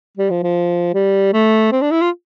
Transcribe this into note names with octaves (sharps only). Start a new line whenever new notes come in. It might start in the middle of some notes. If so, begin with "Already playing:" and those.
G3
F3
F3
G3
A3
C4
D4
E4
F4